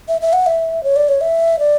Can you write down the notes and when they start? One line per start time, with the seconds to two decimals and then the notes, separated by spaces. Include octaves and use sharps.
0.08 E5
0.21 E5
0.33 F#5
0.46 E5
0.84 C#5
0.96 D5
1.09 C#5
1.21 E5
1.59 D5